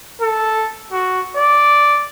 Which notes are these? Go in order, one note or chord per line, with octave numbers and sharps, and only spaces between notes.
A4
F#4
D5